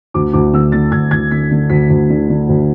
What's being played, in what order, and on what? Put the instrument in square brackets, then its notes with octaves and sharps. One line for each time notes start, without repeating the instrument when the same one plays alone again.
[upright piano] D2 D6
D2 D6
D3 E6
D3 A6
D2 G#6
D2 G#6
D3 B6
D3
D2 B6
D2
D3
D3
D2